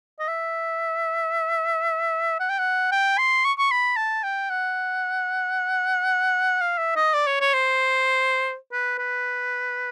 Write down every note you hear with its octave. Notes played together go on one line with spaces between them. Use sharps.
D#5
E5
F#5
G5
F#5
G5
C6
C#6
C#6
B5
A5
G5
F#5
F5
E5
D#5
D5
C#5
C#5
C5
B4
B4